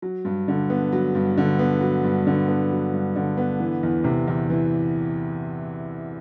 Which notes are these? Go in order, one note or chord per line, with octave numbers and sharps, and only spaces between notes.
F#3
G2
D3
B3
F#3
G2
D3
B3
F#3
G2
D3
B3
F#3
G2
D3
B3
E3
E2
C3
E2
E3